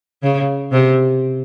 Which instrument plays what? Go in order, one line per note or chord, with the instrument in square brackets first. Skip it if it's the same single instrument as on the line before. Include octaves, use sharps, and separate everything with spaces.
[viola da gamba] C#3
C3